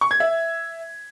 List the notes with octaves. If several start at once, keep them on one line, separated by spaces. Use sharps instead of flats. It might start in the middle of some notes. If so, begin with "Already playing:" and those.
C#6
G#6
E5